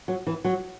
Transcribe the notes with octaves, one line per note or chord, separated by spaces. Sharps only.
F#3
E3
F#3